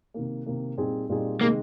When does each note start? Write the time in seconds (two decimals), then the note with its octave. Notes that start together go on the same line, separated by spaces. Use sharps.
0.14 C3 D#3 A#3
0.46 C3 D#3 A#3
0.77 A#2 G3 C4 D#4 G#4
1.09 A#2 G3 C4 D#4 G#4
1.41 C3 D#3 G#3 A#3